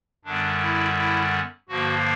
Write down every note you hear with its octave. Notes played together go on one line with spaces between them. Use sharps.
F#2 D3 G3 B3 D4
E4
E4
G2 D3 F3 A#3 F#4